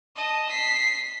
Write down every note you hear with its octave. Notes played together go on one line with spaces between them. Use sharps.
D#5 A5
B6 C7